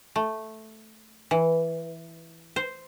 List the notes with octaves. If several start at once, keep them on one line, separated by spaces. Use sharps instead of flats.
A3
E3
C5